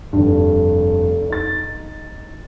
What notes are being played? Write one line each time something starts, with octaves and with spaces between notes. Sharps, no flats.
F1 G2
D#4 A6